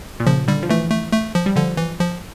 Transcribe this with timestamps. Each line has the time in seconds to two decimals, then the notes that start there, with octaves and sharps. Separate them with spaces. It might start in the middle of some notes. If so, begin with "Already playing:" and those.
0.20 A#2
0.27 C#3 F3
0.48 D3 G3
0.63 F3
0.69 E3 A3
0.91 A3
1.13 A3
1.35 F3
1.46 G3
1.56 D3 F3
1.77 E3
2.00 F3